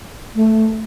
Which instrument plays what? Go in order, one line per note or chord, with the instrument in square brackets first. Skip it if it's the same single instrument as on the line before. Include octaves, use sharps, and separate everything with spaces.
[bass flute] A3